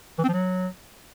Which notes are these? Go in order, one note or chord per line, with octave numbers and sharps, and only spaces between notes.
E3
C4
F3
F#3